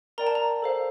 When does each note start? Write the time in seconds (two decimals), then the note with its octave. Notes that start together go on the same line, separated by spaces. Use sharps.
0.18 A#4 D5 G5 A#5
0.27 A5
0.35 A#5
0.62 A4 C5 F5